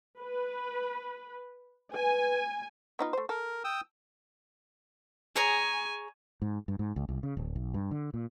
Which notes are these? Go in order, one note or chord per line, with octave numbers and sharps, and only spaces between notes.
B4
B4 G#5
B3 D#4 F4
A3 C5
A4 A#4
G5 D#6 E6
G#4 C#5 G#5 A#5
G#2
G2
G#2
C#2
C2
C#3
D1
B1
G2
D3
A#2